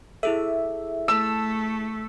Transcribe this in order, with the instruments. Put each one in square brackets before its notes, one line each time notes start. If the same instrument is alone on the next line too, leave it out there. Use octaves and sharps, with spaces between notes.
[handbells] E4 G#4 A4 [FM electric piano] E5
[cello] A3 [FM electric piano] A5 [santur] E6